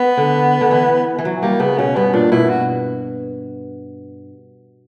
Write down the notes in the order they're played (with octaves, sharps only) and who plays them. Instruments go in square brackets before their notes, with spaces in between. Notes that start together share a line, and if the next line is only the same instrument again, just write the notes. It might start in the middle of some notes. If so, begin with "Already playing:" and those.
Already playing: [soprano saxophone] B3
[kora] D3
D3
E3
E3
F#3
[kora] G3 [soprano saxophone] A#3
[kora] C#3 [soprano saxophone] B3
[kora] B2 [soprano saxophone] C#4
[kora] G2 [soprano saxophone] B3
[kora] A#2 [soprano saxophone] D4
[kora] B2 [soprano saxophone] E4
[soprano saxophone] F#4